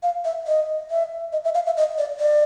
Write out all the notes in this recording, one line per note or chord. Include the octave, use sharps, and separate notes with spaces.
F5
E5
D#5
E5
D#5
E5
F5
E5
D#5
D5
D5